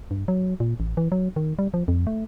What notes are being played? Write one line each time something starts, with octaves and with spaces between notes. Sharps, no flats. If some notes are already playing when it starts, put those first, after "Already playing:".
G2
F#3
A#2
A1
E3
F#3
D#3
G3
F3
F2
A3